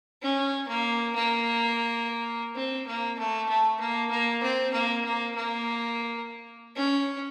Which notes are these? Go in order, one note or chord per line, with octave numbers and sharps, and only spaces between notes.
C#4
A#3
A#3
C4
A#3
A3
A3
A#3
A#3
C4
A#3
A#3
A#3
C#4